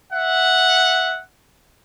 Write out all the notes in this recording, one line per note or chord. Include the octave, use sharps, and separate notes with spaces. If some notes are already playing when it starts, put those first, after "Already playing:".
E5 F#5